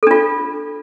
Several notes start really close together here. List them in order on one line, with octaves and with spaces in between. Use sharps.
A4 D4 F4